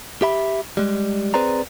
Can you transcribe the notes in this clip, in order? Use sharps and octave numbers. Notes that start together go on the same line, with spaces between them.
G4 E5 B5
G3 G#3
C4 G#4 B4 C5 D5 A#5